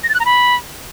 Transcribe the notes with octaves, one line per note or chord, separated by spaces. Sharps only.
A#6
A6
F#6
A#5
B5